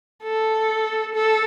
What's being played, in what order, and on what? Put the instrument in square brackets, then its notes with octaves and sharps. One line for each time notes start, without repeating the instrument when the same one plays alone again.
[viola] A4
A4